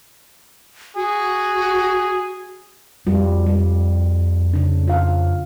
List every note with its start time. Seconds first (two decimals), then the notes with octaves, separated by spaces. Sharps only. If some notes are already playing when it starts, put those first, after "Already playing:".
0.96 F#4 G#4
3.07 F2 G3 F4 F#4
3.46 G3
4.53 C#3 D4
4.88 F4 F5